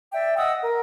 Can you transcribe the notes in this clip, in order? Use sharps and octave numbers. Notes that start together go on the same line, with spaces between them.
D5 E5 G5
D#5 F#5 D#6 E6
A#4